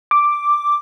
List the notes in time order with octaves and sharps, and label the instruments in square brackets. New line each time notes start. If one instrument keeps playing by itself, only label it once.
[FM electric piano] D6